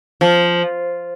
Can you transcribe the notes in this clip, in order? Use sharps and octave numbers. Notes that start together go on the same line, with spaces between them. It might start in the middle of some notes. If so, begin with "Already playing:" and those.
F3